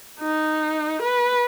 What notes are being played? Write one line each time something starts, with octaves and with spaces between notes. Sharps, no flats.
D#4
B4